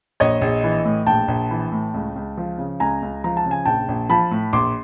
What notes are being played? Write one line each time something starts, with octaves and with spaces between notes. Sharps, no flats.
A#1 C#5 D#5
A#1
E3
A2
A#1 G5 A5
A#1
E3
A2
C#2
C#2
F3
C#3
C#2 G#5 A#5
C#2
F3 A#5
A5
C#3
G#5
A#1 G5 A5
A#1
F3 A5 B5
A2
A#1 C6 D6